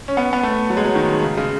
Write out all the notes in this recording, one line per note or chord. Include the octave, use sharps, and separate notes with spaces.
C#4
B3
B3
A3
F#3
G#3
F#3
D#3
C#3
C#3